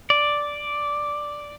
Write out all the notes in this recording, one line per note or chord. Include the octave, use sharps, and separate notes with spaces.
D5